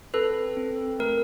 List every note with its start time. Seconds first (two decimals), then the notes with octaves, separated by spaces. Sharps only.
0.14 C4 A4 B4
0.57 C4
0.99 A3 A#4